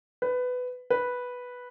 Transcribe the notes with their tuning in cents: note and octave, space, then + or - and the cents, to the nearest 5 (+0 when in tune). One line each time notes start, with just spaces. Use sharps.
B4 +15
B4 -5